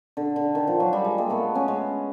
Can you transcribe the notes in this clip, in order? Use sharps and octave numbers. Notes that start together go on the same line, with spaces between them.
D3
D3
D#3
F3
F#3
G3
G#3
G#3 A#3
A3 B3
B3 C#4
G#3